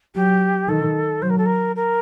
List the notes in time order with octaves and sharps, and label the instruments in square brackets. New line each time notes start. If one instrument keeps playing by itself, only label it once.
[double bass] F#3 [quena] G4
[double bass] D#3 [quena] A4
[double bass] F#3 [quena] C5
[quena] A#4
A4
A#4
A#4